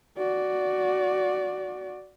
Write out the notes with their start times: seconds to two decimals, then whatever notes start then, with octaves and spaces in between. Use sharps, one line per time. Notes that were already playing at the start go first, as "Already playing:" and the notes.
0.18 F#4 D5